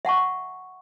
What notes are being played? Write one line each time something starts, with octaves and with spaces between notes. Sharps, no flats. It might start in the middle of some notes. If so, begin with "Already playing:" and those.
E5 F#5 A5 C#6